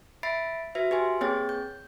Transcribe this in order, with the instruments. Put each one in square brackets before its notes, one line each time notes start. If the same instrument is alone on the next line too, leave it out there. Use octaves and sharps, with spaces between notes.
[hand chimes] E5 B5 A6 C7 D7
F#4 B4 E5
G4 B4 G#5 C6
A#3 C4 G#4 C#5 G5 A6
G6